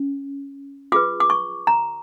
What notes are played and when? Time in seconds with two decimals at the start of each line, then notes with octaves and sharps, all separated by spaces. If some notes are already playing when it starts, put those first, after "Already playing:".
Already playing: C#4
0.92 F4 G#4 B4 D6
1.20 D6
1.30 C#6
1.67 A#5